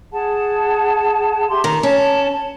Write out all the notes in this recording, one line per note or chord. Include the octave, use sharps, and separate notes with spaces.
G#4 F#5 A5
G4 E5 C6
D#3 A#5
C#4 A5